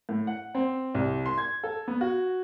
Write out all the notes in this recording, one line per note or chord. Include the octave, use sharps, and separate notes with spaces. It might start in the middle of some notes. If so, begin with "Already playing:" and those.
A2
F#5
C4
C2
C6
G#6
A4
B3
F#4